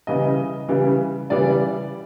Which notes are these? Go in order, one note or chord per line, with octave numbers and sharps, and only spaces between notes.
C#3 E3 G3 D#5
C#3 E3 G3
C#3 E3 G3 D5